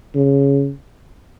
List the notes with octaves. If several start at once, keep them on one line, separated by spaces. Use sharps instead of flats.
C#3